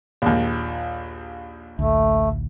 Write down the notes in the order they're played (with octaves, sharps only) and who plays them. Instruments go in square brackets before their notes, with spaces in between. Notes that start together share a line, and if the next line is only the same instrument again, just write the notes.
[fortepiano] A#1 D#2
[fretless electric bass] A1 D2 [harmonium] A3